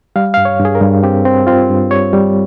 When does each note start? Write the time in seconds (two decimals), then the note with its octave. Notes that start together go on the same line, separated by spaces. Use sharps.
0.16 G3 F5
0.34 F5
0.37 G2
0.45 C#5
0.60 G2
0.65 G#4
0.75 A#4
0.81 G2
1.03 C4 G4
1.25 C4
1.47 C4 F4
1.69 G2
1.91 G3 C#5
2.13 G3